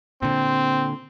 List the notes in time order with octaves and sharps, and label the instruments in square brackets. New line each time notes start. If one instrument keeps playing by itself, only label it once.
[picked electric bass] A#2 D3 [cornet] C4